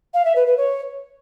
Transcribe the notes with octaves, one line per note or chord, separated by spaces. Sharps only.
F5
E5
B4
B4
C#5